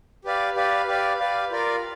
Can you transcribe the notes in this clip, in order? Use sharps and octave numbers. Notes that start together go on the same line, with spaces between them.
G4 B4 D5 F5
G4 B4 D5 F5
G4 B4 D5 F5
G4 B4 D5 F5
F4 A#4 D5 F5